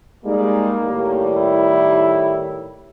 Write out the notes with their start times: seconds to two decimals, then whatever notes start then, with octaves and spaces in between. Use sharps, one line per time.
0.24 G3 G#3 A#3 D#4
0.83 A2 D#3 G3
1.35 E4